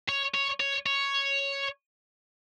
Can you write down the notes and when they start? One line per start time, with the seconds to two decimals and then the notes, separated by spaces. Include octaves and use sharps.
0.09 C#5
0.34 C#5
0.60 C#5
0.86 C#5